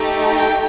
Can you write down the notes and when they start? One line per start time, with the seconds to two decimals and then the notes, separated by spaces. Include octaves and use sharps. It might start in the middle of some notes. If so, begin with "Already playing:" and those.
Already playing: A3 D#4 G4
0.34 G5